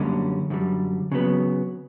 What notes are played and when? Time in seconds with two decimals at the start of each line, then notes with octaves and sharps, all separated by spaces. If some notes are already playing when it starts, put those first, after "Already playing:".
Already playing: F#2 D3 G3 A#3 C#4
0.50 F#2 D3 G3
1.12 C#3 F#3 B3